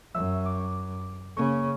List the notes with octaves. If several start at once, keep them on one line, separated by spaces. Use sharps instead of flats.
F#2 E5 E6
D6
C#3 A#3 C#4 C#6